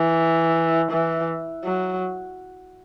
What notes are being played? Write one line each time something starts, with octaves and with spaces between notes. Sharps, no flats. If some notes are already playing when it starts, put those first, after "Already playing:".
Already playing: E3
E3
F#3